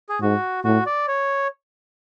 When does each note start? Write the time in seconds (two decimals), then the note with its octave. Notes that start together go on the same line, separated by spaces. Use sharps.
0.09 G#4
0.21 G#2 F#4
0.64 A2 F#4
0.86 D5
1.08 C#5